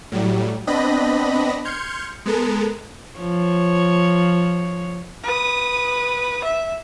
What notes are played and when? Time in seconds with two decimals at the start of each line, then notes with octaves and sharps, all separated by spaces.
0.12 A2 F#3 G3
0.67 B3 C4 D4 D#5 B5 A#6
1.65 C6 F6 G6 G#6 C#7
2.26 G#3 B3 A4 A#4
3.19 F3 C#5
5.24 B4 D#6
6.44 E5